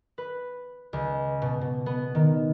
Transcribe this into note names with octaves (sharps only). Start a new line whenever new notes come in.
B4
C#2
B2
B2
B3
D#3